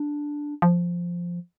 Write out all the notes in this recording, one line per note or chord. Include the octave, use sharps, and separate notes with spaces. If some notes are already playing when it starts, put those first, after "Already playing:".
Already playing: D4
F3